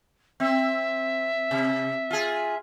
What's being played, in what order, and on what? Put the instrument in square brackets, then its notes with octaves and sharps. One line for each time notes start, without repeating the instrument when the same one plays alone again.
[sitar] C4 [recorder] E5
[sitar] C3
F4 G#4